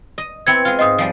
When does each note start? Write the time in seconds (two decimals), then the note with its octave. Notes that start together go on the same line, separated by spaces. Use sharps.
0.18 D#5
0.47 B3 C4 E4 G#6 C#7
0.65 G#3 F4
0.79 G#2 C5 D#5 C6 D#6
0.98 F3 G3 G#3